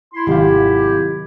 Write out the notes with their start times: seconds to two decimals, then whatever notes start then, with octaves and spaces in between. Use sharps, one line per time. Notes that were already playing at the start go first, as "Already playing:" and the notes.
0.14 E4 C6
0.27 G#1 C3 D#3 F#3 F4 G4